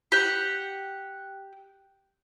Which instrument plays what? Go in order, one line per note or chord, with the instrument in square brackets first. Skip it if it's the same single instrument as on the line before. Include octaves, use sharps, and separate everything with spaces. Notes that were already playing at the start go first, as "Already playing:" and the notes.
[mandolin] G4 F#5